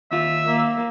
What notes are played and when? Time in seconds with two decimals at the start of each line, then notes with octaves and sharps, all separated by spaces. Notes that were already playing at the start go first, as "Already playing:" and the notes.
0.11 D#2 F4 E5
0.47 A#3